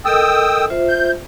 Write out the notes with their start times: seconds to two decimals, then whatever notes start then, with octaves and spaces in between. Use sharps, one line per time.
0.05 A4 A#4 D#5 G5 D#6 E6
0.70 F4 C5 E5
0.89 G6